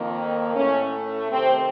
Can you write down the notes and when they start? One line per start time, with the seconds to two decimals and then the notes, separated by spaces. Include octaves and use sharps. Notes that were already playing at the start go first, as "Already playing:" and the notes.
Already playing: F2 D#3 A#3
0.55 A2 A3 C#4
1.31 C3 D#3 A3 C4